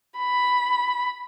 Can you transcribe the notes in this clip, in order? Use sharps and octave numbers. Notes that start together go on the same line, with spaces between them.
B5